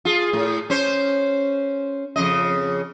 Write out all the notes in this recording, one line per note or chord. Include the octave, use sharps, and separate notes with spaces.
F4 G#4
A2
C#4 C5
F2 C#3 D#5